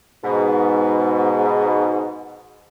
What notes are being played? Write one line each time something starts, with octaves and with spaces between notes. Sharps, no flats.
G#2 B2